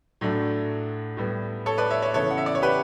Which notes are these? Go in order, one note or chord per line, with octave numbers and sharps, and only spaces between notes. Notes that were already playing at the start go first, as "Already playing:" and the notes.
A2 F#3 A3 D4
A2 G3 B3
A4 C#5
B4 D5
C#5 E5
C#5 E5
C#3 E3 B3 E4 A4 C#5
F#5
E5
D5
C#5
G4 B4